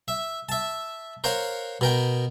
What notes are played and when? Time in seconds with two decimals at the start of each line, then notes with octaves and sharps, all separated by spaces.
0.08 E5
0.49 E5 A5
1.24 A#4 C5 C#5 F5 F#5
1.81 B2 A#4 G5